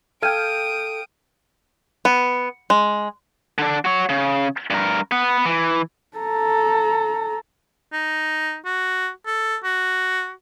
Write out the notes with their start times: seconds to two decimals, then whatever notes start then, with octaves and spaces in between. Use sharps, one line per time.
0.23 A4 F5 G5 D#6 F6 G#6 D7 D#7
2.05 B3
2.70 G#3
3.58 D3 D4
3.85 F#4 C#5
4.09 C#3
4.70 G2 A#4
5.12 B3 B4
5.46 E3
6.18 A4 A#5
7.92 D#4
8.65 F#4
9.26 A4
9.64 F#4